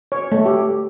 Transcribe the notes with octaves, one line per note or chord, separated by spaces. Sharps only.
C#5
A3
G4